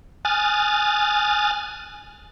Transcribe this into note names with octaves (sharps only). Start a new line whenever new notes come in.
G#5 D#6 F6 F#6 A6